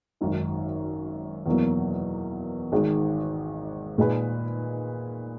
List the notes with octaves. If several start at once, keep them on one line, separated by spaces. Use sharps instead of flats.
G#1 F#2 D#3
E2 B2 F#3 A#3
G#1 G#2 D#3 G#3
A#2 G#3 D#4 G#4 B4